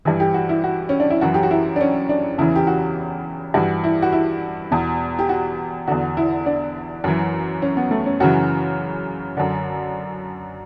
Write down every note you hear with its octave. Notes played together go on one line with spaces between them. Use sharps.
G2 E3
G4
F#4
E4
F#4
C#4
D4
E4
F#2 E3 F#4
G4
F#4
E4
D4
C#4
D4
E2 C#3 E3 E4
G4
F#4
G2 E3 F#4
E4
F#4
E4
E2 B2
G4
F#4
E2 D3 F#4
E4
D4
F#2 E3
C#4
B3
A3
C#4
F#2 C#3 E3 F#4
F#2 D3